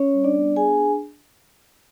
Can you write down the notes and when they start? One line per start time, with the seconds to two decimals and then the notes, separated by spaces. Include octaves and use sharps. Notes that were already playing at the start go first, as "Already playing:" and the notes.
Already playing: C#4 C#5
0.14 G3
0.24 D4 D5
0.35 B3
0.56 D4 G#4 G#5
0.78 D4